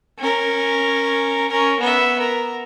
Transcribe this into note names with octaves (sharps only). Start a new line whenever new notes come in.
C#4 A#4
C#4 A#4
B3 E5
A#4